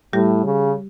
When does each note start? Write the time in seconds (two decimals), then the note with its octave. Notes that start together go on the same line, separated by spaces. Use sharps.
0.13 A2 G3 G4
0.45 C#3